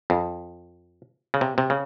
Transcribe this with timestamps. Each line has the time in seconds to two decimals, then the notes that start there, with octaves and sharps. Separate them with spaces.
0.10 F2
1.34 C#3
1.41 C3
1.58 C3
1.70 C#3